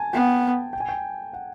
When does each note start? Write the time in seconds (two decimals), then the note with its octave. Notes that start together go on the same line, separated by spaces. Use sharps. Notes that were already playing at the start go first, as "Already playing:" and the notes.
Already playing: G#5 A5
0.13 B3 G5
0.73 G5
0.80 G#5
0.89 G5
1.33 F#5